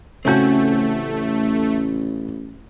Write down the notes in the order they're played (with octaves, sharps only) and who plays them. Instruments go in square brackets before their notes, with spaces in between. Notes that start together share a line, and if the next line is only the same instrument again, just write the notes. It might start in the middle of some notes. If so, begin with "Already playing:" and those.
[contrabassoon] A1 [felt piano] C#3 G6 [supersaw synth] A3 [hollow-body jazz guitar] C4 C#4 F#4